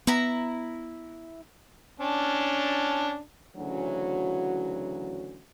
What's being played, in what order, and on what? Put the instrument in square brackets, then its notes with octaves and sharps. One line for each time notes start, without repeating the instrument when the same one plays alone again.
[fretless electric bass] B3 [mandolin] E4 A#5
[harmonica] C#4 D4 A5
[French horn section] D2 C#3 E3 F#3 C#4 F#4